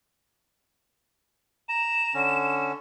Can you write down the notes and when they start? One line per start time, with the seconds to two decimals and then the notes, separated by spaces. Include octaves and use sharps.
1.69 A#5 E7
2.14 D3 C#4